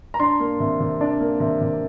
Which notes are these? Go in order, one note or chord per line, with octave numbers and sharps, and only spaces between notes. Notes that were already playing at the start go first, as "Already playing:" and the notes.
A#5
D4 C6
A#3
C3
C3
D4
A#3
C3
C3